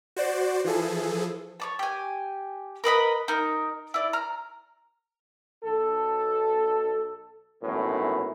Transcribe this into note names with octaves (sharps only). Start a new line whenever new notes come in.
F#4 C5 D5
E3 F3 G#4 A4
C#5 D5 A5
G4 G#5
A#4 B4 D#5 B5
D#4 A#4
E4 D5
A#5 F6
B1 A4
G#1 F#2 A2 E3 B3